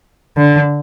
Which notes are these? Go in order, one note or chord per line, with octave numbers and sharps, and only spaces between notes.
D3